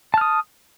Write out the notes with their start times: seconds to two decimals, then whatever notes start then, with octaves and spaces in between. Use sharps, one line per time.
0.14 A5
0.18 F6
0.21 D#6